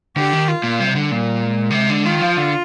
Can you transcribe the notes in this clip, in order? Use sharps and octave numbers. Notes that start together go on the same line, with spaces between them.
D3 G4
D#3
F4
A#2
C3 G3
D3
A#2 G3
G#3
D3
C3
D3
D#3 F4
F3
D3